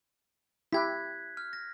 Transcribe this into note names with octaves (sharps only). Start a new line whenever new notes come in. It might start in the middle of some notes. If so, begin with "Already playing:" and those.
E4 G4 F#6 G#6 B6
F6
A#6